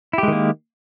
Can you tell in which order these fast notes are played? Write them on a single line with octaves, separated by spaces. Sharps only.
E4 G4 G#3 D#3 A#3